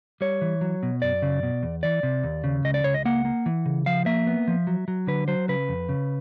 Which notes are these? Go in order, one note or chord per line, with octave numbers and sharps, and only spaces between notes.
G3 C#5
E3
F#3
B2
F#2 D5
C#3
B2
E2
E3 D5
C3
D#2
C#3
C#2 D#5
D5
C#2 C#5
D#5
A#3 F#5
A#3
E3
C#3
F3 F5
A#3 E5
B3
F3
F#3
F#3
D3 B4
F#3 C5
C#3 B4
F2
C#3